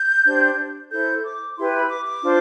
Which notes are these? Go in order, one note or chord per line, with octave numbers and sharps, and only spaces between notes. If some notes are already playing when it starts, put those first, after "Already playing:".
Already playing: G6
D4 G4 C5
E4 A4 C5 G6
D6
E4 G4 B4 C6
B5
D6
D6
D4 F4 C5